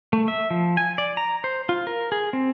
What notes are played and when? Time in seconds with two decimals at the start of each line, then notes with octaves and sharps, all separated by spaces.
0.13 A3
0.28 E5
0.51 F3
0.77 G#5
0.98 D5
1.17 A#5
1.44 C5
1.69 F4
1.87 A#4
2.12 G#4
2.33 C4